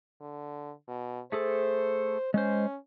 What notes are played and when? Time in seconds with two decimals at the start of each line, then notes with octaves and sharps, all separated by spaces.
0.21 D3
0.88 B2
1.32 A3 G#4 A4 C5
2.34 G#3 C#4 C5